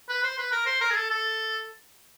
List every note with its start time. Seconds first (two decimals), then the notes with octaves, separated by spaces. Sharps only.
0.09 B4
0.24 C5
0.38 B4
0.52 A#4
0.66 C5
0.81 A#4
0.91 G#4
0.96 A4
1.10 A4